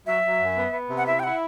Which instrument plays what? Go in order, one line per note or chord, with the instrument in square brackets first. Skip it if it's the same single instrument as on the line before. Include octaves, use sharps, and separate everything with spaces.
[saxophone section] F#3 [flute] E5
[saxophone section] F#3
F#2
B3
B3
C3
[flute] F#5
[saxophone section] E4 [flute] E5
[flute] G5
[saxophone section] E4 [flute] F#5